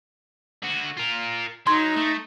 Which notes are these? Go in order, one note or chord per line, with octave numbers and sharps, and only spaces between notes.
D3 F#4
F4 A#4
F#3 D#4 C6 G#6
A3